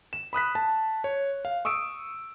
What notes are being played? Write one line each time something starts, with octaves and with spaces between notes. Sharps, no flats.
E7
B5 D#6 F#6 B6
A5
C#5
F5
C#6 D#6 E6 D7